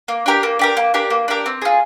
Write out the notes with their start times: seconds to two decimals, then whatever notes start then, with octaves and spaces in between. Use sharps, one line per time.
0.08 A#3
0.26 D4 G4 A#4
0.43 A#3
0.59 D4 G4 A#4
0.77 A#3
0.94 D4 G4 A#4
1.10 A#3
1.28 D4 G4 A#4
1.46 C4
1.62 F4 G#4